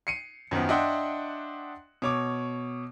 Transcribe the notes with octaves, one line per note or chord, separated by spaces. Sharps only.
C7 C#7 D#7
F#2 D#3 F3 B3
D4 D#5 E5 F#5 G5 C6
B2 C#5 D6